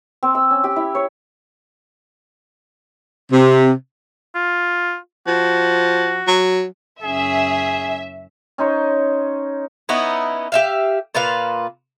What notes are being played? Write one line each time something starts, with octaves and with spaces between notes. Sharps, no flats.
C4
E6
C#4
G4
E4
C#5
C3
F4
F3 F#4
F#3
F#1 C#4 G#4 E5
C#4 D#4 C5 C#5
B3 C#4 D#4 E4
G4 E5 F5
A#2 F4 B4 F5